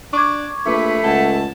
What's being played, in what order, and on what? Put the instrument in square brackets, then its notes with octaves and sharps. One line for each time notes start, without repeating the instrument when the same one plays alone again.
[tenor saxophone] D4 [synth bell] C#6 D6 G#6
[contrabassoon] A#1 [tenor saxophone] A3 [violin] B4
[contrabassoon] C#2 [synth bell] F#5 [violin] A5